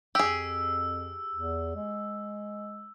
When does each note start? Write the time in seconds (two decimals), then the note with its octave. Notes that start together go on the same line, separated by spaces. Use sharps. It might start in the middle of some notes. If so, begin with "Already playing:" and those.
0.15 F2 G4 G#4 E6
1.35 E2
1.75 G#3